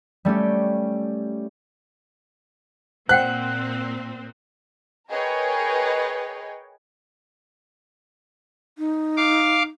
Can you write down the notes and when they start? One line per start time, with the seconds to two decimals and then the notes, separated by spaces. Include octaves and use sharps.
0.25 G3 A3 C#4 G4
3.09 A#2 C4 C5 F#5 G5 F#6
5.11 G#4 A#4 B4 C#5 D#5 G5
8.78 D#4
9.17 F5 D6